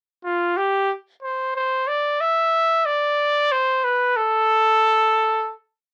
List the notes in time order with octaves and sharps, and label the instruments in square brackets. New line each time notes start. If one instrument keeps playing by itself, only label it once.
[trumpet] F4
G4
C5
C5
D5
E5
D5
C5
B4
A4